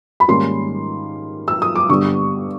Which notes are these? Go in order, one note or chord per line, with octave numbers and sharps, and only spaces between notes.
B5
G#2 D#3 G3 A#3 C#4 C6
E6
D#6
D6
G2 D3 G3 B3 C#6